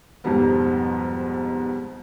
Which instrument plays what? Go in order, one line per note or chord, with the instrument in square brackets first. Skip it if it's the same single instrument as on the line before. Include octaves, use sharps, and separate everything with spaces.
[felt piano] F2 G#2 B2 F3 G3 B3